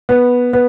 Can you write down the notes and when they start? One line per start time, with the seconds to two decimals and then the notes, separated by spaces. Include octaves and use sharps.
0.09 B3
0.53 B3